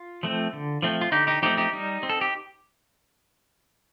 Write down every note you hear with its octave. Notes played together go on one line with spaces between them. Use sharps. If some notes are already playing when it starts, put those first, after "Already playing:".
Already playing: F4
F3 A3 C4
D3
F3 A3 C4
F4
D3 D#4 G4
D#4 G4
F3 A3 C4 D#4 G4
D#4 G4
G3 D#4
C4
A4
G4